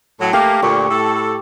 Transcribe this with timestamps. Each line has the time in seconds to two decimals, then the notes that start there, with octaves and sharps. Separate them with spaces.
0.21 A2 F#3
0.33 A3 A#3 G4
0.62 D2 A#2 C#6
0.90 A2 A4